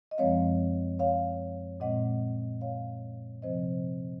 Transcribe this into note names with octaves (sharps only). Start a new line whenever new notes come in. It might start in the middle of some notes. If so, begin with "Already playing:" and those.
D#5
F#2 F3 G#3 C4 C#5 F5
C#5 F5
A#2 G#3 C4 D#5 F#5
C#5 F5
C3 F3 C4 C5 D#5